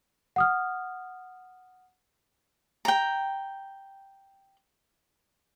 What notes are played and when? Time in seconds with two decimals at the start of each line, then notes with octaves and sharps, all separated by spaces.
0.36 F#5 D#6 F6
2.85 G5 A#5